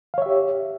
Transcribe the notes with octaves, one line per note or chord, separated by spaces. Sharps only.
G4 C#5 E5 F5